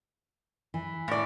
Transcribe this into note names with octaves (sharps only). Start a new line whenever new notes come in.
E3
A2 D5